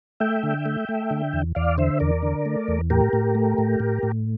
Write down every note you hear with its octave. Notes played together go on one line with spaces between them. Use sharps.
A3 E5 G5
D3
A3
A3
D3
E2
E2 D5 F5
D3 C5 E5
E2 A#4 D5
D3
A3
E2
A2 G4 A#4
A2
A3
A2
A2
A2